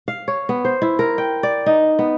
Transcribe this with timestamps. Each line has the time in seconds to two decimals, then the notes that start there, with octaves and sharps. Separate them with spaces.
0.08 F5
0.28 C#5
0.49 B3
0.65 C5
0.82 E4
0.99 A#4
1.18 G5
1.43 D5
1.66 D#4
1.99 B3